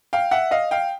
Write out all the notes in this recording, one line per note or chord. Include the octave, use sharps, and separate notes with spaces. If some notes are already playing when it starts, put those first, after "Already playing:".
F5 G5
E5 F#5
D#5 F5
F5 G5